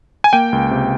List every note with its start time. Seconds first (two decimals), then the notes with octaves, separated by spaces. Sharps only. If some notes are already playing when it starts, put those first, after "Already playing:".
0.24 G#5
0.33 A#3 G5
0.53 C#2
0.71 C3